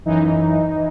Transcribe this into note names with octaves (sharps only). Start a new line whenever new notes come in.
F#2 E3 D#4
E3